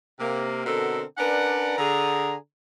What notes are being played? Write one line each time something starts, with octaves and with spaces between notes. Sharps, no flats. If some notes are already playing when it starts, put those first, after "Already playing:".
C3 A#3
B2 D3 C4 A4 A#4
C#4 D4 A#4 B4 D5 F#5
D3 G#4 A#5